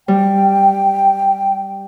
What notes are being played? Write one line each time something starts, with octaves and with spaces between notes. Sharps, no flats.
G3 G5